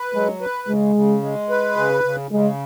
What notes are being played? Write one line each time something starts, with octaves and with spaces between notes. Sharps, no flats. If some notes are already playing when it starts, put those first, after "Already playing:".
Already playing: B4
F#3 G#3
B4
C#3 G#3
C#3
G#3
B4
C#3
C#3
C#3 G#3